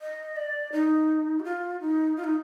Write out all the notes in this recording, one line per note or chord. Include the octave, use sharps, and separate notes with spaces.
D#5
D5
D#4
G4
F4
D#4
F4
D#4